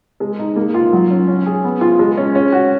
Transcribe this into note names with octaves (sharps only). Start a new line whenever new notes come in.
G#3
D#4
A#3
F4
F#3
C#4
C#4
G#4
B3
F4
G#3
C#4
C#4
F#4